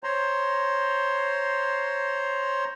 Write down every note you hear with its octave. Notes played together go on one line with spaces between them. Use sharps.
C5 C#5 A#5 C6